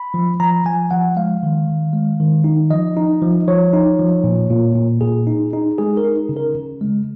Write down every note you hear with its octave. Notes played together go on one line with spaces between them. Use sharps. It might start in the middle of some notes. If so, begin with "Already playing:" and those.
Already playing: B5
F3
F3 A#5
F3 G#5
F3 F#5
G#3 F5
D#3
D#3
G#3
D#3
D#4
F3 D#5
D#4
F3
F3 C#5
D#4
F3
A#2
A#2
A#2
A#2 G#4
D#4
D#4
G#3 G#4
A#4
D#4
C#3
A#4
C#3
G#3